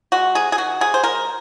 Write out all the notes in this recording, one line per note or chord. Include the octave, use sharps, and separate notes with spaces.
G#3 F#4
C3 G#4
G#4
D#3 F#4
C3 G#4
C5
G#3 A#4